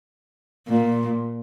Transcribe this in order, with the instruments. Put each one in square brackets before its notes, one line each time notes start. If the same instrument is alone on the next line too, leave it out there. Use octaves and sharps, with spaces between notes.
[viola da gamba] A#2